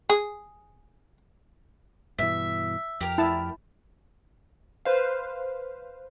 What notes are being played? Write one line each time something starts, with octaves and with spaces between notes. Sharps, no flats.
G#4
G2 B2 E3 E5
F2 G4 A#4
E4 A5
B4 C5 F5